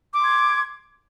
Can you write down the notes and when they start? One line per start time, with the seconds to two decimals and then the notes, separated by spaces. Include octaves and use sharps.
0.14 D6
0.18 C6
0.23 G#6